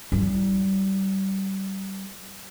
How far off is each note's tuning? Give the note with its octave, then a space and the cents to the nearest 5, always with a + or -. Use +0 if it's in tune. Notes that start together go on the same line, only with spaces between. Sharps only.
G3 -25 E4 +0